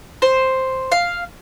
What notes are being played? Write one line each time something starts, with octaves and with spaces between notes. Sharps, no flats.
C5
F5